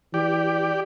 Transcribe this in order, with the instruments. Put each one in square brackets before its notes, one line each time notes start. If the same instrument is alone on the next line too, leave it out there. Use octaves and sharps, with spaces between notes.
[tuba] E3 [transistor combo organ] G4 D5